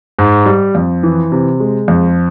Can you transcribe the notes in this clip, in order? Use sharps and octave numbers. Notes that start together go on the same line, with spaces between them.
G#2
G3
F2
E3
C3
G#3
F2